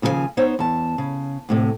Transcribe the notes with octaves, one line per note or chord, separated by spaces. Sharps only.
D#2 C#3 F3 A4 F5 G#5
B3 D#4 C5 C#5
E2 A5
C#3
D2 A2 C3